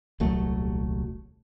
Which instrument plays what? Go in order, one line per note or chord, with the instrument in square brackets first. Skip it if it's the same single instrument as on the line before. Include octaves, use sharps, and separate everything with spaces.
[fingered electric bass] D#1 C2 F#3 A3